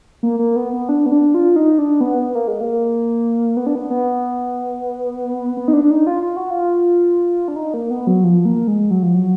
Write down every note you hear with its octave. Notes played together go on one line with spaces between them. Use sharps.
A#3
A#3
B3
B3
D4
B3
D4
F4
D#4
D4
B3
B3
A#3
G#3
A#3
B3
D4
B3
B3
B3
D#4
D4
D4
D#4
F4
F4
F#4
F4
D4
D#4
A#3
B3
F#3
F3
A#3
G#3
F#3
F3
F#3